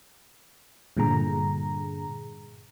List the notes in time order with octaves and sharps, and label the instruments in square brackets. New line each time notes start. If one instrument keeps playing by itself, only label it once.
[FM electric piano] G2 A#2 D3 G#4 A#5